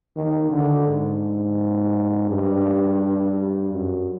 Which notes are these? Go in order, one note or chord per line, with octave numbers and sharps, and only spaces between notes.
D#3
D3
G#2
G2
F#2